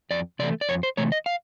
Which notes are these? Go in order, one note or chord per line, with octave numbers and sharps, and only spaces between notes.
F2 D5
C3 E3 A3 D5
D5
F2 C#5
C5
C3 E3 A3 C#5
D#5
F5